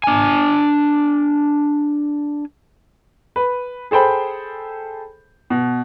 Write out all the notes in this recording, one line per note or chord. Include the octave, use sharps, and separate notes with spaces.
D4 G#5
B4
G#4 A4 C5 G5 B5
B2